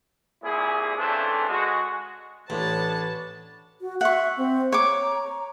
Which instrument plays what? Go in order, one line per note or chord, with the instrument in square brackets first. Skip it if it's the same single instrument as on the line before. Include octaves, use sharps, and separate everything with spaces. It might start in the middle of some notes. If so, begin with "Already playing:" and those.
[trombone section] C2 A#2 E4 G#4
C#3 E3 A3 C4 D4
G#3 F#4
[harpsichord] A1 A2 [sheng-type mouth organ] B3 D4 C#5 [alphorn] B4 [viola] A5
[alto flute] F#4
[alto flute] E5 [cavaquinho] F#5 C#6
[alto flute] C4
[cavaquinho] C#5 D6 [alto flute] A#5